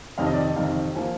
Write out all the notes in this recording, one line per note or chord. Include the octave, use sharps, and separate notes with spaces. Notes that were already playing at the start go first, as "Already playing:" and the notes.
F2 C3 D#3 F5
D#5
D5
D#5
F2 C3 D#3 F5
F3 A#3 G#5